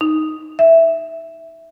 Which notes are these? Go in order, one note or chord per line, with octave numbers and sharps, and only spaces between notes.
D#4
E5